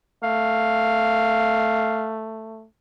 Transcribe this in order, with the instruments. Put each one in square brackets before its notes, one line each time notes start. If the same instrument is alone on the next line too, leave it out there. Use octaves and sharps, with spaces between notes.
[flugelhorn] A3 [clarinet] F5